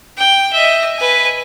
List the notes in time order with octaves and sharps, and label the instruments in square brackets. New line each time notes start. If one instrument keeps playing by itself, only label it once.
[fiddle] G5
D#5 E5
B4 G#5